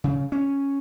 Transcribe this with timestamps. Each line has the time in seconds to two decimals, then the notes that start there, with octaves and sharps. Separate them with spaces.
0.04 C#3
0.32 C#4